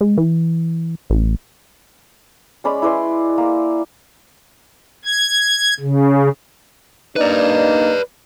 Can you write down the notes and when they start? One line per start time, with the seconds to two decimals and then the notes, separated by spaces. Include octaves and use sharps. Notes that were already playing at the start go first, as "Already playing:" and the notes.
0.01 G#3
0.18 E3
1.10 A1
2.64 G#3 C#4 D5 B5
2.82 E4 B4 D5 C6
3.38 A#3
5.05 G#6
5.80 C#3
7.16 A#3 D4 D#4 B4 D5